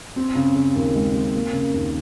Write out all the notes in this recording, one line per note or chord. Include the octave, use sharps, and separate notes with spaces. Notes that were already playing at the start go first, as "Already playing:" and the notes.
C4
C#3
C#3
D#2
G#3
C4
A#3
C#3
D#2